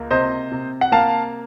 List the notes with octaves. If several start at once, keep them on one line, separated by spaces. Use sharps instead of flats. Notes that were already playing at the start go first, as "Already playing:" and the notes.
Already playing: C#2 A#3
C3 C5 D#5
C3
F#5
A#3 F5 A5